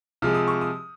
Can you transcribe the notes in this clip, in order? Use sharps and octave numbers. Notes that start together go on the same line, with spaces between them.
C3 F3 G#3 F6
D#6
C#6
D#6